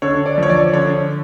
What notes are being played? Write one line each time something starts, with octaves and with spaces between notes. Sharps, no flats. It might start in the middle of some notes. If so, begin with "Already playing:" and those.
D3 C#5
D5
F3 C#5
D5
D3 C#5